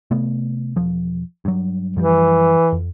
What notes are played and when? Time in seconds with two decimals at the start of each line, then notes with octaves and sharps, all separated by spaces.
0.11 C3 A3 B3
0.76 E1 F3
1.45 G2 F#3
1.96 F#2 E3 F3 G3
2.72 F2